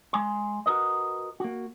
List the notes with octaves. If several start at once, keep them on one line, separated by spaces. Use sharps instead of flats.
G#3 G#5 C6
F#4 A#4 B4 D#5
A#3 F#4